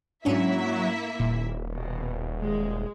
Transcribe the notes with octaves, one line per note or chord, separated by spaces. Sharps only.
G#2 F#3 A#3 C#4 D4 E4 E5
D#1 A#2
B2
G#3